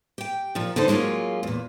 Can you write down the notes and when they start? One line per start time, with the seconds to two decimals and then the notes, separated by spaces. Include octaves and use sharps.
0.18 G4 G5
0.55 A#2 F3
0.76 D3 E3 G3 D#4 A4 C5
0.88 F#3 G#3 A#3 C#4 F4
1.43 E2 A#2